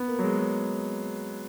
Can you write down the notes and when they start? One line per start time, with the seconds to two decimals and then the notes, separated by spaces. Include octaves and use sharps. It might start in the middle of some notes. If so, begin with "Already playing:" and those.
Already playing: B3
0.08 A#3
0.19 F#3
0.24 G#3
0.39 F#3